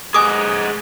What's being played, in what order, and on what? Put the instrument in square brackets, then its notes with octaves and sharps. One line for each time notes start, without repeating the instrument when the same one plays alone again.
[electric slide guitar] G#4 D#5 F#5 [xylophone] G#5 D6 D#6